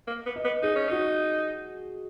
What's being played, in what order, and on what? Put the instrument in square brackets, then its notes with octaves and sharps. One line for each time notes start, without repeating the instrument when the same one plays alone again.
[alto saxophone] A#3
B3
[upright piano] D#5
[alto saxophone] B3
[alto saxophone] D#4 [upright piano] G#4
[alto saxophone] C#4
[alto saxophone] D#4 [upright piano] F#4